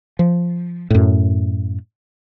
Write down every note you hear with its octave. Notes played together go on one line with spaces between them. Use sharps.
F3
F#2 A2